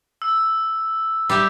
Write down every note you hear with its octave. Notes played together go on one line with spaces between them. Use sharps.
E6
G3 G4 E5